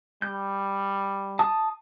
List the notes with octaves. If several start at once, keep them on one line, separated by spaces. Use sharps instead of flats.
G3 G6
A5 D#6